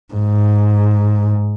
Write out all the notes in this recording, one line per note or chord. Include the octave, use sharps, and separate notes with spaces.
G#2